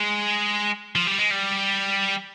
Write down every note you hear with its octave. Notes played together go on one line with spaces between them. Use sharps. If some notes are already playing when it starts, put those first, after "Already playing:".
Already playing: G#3
F3
G3
G#3
G3